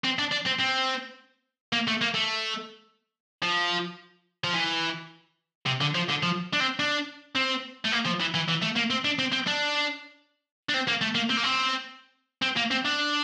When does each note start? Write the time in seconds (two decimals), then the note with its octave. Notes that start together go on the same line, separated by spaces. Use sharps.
0.04 C4
0.19 D4
0.32 D4
0.46 C4
0.60 C4
1.73 A#3
1.88 A3
2.01 A#3
2.15 A3
3.42 F3
4.44 F3
4.54 E3
5.66 C3
5.81 D3
5.95 F3
6.09 D3
6.23 F3
6.53 D4
6.60 C4
6.80 D4
7.35 C4
7.85 A3
7.92 A#3
8.06 F3
8.20 E3
8.34 E3
8.48 E3
8.62 A3
8.76 A#3
8.90 C4
9.05 D4
9.19 C4
9.32 C4
9.47 D4
10.69 D4
10.74 C4
10.88 A#3
11.01 A3
11.15 A#3
11.30 C4
11.37 A#3
11.44 C4
12.42 C4
12.56 A#3
12.71 C4
12.85 D4